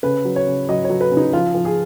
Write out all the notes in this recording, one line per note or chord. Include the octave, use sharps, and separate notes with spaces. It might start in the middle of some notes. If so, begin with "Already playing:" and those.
C#3 B4
F#3
C#5
C#3
F#3 D#5
C#5
F#3
B4
C#3
D#4
F3 F4
F3
G#4